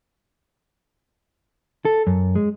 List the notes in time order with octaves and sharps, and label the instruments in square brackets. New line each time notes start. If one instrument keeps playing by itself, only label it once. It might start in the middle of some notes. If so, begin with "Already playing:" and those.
[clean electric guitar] A4
F#2
G#3